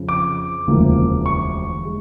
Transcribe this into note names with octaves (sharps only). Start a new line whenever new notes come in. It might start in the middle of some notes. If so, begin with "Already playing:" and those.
Already playing: F2 C#3 F3
D6
E1 D2 C#3 F3 A#3
C#6
G#3